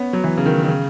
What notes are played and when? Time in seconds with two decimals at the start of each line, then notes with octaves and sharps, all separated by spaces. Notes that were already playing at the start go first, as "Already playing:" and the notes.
Already playing: B3 C#4
0.13 F#3
0.24 E3
0.38 C#3
0.46 D#3
0.63 D#3
0.68 C#3